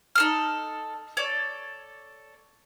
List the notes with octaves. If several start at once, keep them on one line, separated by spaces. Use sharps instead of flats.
D#4 A4 F6
A4 C#5 D5